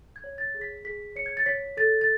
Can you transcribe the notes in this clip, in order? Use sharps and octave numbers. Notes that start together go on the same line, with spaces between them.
G#6
C#5
A6
G#4
B6
G#4 B6
C#5 C#7
G#6
A6
C#5 B6
A4 A6
A6